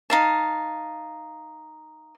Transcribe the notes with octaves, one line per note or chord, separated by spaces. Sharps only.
D#4 F5 A5